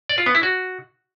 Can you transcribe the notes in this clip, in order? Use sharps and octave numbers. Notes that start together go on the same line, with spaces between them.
D5
F4
B3
E4
F#4